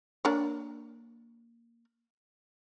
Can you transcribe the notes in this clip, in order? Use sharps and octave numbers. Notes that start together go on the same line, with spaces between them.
A#3 D4 C#5